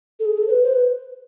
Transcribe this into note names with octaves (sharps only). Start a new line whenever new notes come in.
A4
G#4
A4
C5
B4
C5
B4